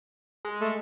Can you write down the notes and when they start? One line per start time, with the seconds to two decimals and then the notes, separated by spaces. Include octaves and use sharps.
0.45 G#3
0.61 A3